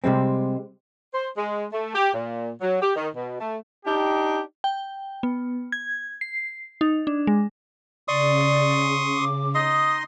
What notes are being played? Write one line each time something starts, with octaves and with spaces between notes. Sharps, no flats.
C3 G3 G#3 C4
C5
G#3
A3
G4
A#2
F#3
G4
D#3
B2
A3
D4 D#4 G4
G5
B3
G#6
C7
D#4
D4
G#3
C#3 D5 C6 C#6 D#6
D6
D#4 D#5 C6 D#6